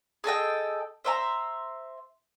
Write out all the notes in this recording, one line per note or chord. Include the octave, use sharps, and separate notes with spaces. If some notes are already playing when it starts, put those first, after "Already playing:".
G#4 A4 D#5 G5
C5 E5 A#5